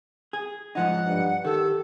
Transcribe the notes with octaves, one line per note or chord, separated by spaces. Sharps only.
G#4
G#2 F3 D#4 F#5
G2
D#3 G4 A4